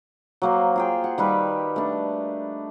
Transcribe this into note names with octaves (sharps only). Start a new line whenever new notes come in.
F#3 A#3 C5
F4 G#4 G5
F#5
D#3 G3 G4 B4
A3 D4